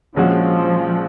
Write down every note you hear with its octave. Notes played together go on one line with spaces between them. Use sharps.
A#1 A#2 F3 G#3 C#4 F#4